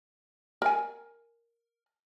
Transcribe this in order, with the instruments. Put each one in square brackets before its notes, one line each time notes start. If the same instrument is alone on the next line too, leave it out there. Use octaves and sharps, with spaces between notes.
[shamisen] A#4 G#5